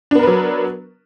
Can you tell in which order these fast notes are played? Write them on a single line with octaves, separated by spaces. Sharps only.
D4 B3 A#4 B4 F#3